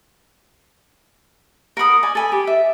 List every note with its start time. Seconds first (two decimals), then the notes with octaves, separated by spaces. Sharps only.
1.77 A#4 F#5 B5 D#6
2.03 D5 G#5
2.15 A4 G#5 B5
2.32 G4
2.47 E5